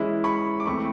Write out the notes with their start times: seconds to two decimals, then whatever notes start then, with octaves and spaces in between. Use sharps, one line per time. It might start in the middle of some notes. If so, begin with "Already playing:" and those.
Already playing: E3 G#3 C#4 E4
0.24 B5 C#6
0.60 D6
0.66 E3 A3 C4 B5 C#6